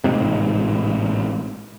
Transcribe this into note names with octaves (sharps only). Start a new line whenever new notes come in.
A1 G#2 C3